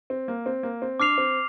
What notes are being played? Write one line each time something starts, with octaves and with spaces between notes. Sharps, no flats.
C4
A#3
C4
A#3
C4
D4 D6 F6 C7 F7
C4